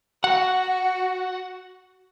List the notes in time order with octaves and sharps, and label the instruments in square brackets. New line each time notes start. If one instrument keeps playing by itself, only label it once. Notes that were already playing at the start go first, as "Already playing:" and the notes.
[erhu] F#4 [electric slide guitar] F#5